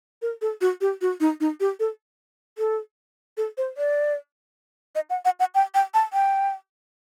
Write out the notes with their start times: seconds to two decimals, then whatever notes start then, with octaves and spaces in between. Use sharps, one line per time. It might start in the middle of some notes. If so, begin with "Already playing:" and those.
0.22 A#4
0.42 A4
0.61 F#4
0.81 G4
1.01 F#4
1.20 D#4
1.40 D#4
1.60 G4
1.80 A4
2.58 A4
3.37 A4
3.58 C5
3.77 D5
4.95 D#5
5.10 F#5
5.25 F#5
5.40 F#5
5.55 G5
5.74 G5
5.94 A5
6.13 G5